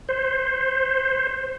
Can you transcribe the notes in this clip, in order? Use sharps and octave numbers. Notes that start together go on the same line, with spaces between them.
C5